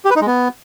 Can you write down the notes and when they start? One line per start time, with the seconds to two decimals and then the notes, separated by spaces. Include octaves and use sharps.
0.05 G4
0.11 B4
0.16 D#4
0.22 G#3
0.27 B3